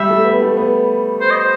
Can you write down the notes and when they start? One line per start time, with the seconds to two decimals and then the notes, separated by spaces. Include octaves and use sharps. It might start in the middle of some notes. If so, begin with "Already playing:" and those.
Already playing: G3 E5
0.10 A3
0.25 B3
0.41 A3
0.57 B3
1.21 C5
1.30 D#5
1.39 C5